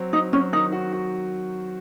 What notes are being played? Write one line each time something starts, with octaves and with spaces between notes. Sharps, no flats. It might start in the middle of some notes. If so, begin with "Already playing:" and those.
Already playing: F#3 C4
C4 D#4
F#3 C#4
D#3 D#4
F#4
F#4